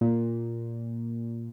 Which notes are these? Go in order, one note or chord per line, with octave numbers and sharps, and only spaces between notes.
A#2